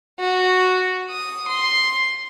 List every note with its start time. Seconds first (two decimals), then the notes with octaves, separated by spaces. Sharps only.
0.20 F#4
1.11 D#6
1.48 C6